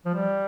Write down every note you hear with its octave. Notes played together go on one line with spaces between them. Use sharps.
F3
G3